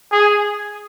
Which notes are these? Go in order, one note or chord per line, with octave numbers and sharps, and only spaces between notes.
G#4